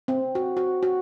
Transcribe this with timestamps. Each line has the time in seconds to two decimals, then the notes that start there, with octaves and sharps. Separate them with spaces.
0.08 C4
0.35 F#4
0.57 F#4
0.83 F#4